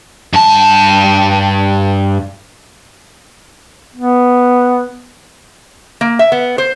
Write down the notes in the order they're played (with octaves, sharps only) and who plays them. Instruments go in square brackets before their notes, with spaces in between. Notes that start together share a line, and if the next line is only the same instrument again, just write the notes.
[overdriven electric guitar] G2 A5
[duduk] B3
[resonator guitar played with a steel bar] A#3
E5
B3
C5